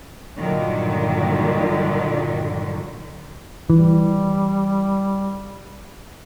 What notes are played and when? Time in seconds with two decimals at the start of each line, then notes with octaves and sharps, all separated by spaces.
0.36 G2 A#2 D3 D#3 F#3
3.70 E3 G3